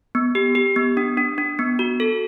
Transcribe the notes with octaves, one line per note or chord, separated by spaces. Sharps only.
B3
G4
G4
B3
D4
D4
D4
B3
F#4
A4